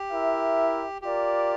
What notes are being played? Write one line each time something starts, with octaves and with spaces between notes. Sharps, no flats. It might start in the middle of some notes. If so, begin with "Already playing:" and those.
Already playing: G4
E4 A#4 E5
F4 G4 A#4 D5